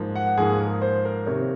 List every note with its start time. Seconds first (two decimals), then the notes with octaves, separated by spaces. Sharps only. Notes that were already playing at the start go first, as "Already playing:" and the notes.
Already playing: G#2 F3 A#3
0.16 F#5
0.37 G#2 F3 A#3 G#4
0.60 A#4
0.82 C5
1.05 A#4
1.26 C3 D#3 A#3 C#5